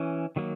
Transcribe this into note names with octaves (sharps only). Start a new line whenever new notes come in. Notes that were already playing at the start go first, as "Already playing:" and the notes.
Already playing: E3 C#4
D#3 F#3 A#3